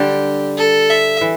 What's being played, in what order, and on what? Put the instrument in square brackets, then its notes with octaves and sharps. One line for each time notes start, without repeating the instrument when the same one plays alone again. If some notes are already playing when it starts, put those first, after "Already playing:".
Already playing: [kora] D3 G3 [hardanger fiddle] G4
[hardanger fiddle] A4
E5
[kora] E3